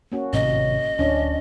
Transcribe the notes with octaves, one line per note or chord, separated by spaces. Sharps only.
A#3 C#4 F#4
G#1 A2 C3 D#5
D1 C#4 D4